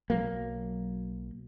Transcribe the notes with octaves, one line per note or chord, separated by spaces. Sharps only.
B1 F#3 A#3